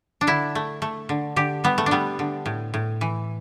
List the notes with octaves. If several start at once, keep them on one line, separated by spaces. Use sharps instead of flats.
D4
D3 E4
A3
A3
D3
D3 G4
G3 B3
A3
D4
G3 B3
D3
A2
A2
E3